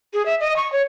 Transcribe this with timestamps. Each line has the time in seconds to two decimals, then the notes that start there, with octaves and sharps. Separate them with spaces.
0.14 G#4
0.26 E5
0.40 D#5
0.57 C#6
0.72 C#5